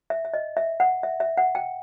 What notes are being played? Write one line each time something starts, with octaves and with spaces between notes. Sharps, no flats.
E5
E5
D#5
E5
F#5
E5
E5
F#5
G5